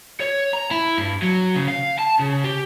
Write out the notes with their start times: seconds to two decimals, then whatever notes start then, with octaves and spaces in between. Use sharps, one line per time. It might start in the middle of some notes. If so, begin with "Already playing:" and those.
0.20 C#5
0.53 A#5
0.71 E4
0.98 G2
1.22 F#3
1.55 C#3
1.68 F5
1.99 A5
2.20 C#3
2.44 G4